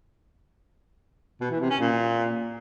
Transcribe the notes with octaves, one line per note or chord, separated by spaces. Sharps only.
B2
E3
C3
C#4
A#2